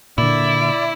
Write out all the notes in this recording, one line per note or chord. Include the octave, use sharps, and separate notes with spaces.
A#2 D3 E4 D5